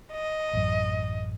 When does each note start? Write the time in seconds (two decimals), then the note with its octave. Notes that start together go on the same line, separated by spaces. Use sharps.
0.12 D#5
0.53 A1 F#2